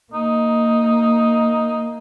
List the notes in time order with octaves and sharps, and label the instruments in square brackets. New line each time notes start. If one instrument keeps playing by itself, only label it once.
[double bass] A#3 [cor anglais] D#4